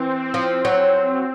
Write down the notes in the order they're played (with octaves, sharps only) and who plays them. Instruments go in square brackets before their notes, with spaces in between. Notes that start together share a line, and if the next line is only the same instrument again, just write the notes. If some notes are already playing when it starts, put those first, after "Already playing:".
Already playing: [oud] E3 [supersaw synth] C4
[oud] F3
F#3